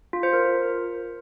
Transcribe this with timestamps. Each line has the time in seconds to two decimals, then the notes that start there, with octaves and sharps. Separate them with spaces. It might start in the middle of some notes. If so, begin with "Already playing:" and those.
0.13 F4
0.23 C5
0.33 A#4